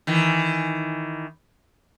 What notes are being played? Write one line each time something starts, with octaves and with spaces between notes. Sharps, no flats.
D#3 E3